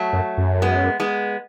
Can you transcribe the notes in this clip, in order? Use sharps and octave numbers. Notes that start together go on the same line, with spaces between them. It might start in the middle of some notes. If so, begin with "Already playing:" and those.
Already playing: F#3 A3
F#2
F#2
G#3 B3
G#3 B3